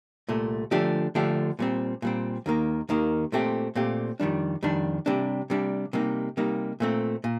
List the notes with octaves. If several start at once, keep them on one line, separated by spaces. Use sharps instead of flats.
C2 A#2 A3
D3 F3 A3 D4 G4
D3 F3 A3 D4 G4
A#2 G3 C4
A#2 G3 C4
D#2 D#3 A#3
D#2 D#3 A#3
A#2 A3 C4 G4
A#2 A3 C4 G4
F2 D#3 G3 D4
F2 D#3 G3 D4
C3 G3 D4
C3 G3 D4
C3 G3 A#3 D#4
C3 G3 A#3 D#4
A#2 A3 C4
A#2